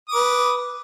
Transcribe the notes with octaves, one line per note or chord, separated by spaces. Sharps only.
B4 D6 D#6